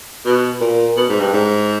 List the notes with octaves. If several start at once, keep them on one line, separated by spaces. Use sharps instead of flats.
B2
A#2
B2
G#2
G2
G#2